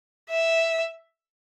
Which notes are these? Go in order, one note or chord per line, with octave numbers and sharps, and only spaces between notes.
E5